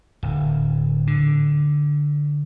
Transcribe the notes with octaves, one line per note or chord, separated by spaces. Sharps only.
D1
D3